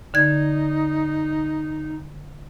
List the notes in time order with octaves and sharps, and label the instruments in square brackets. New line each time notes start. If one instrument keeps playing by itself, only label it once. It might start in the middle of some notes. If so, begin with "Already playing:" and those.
[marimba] D3 G#6 [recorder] D#4